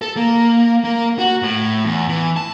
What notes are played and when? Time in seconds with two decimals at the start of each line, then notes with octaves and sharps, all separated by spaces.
0.02 A4
0.17 A#3
0.84 A#3
1.19 F#4
1.42 A2
1.85 E2
2.09 E3
2.37 A5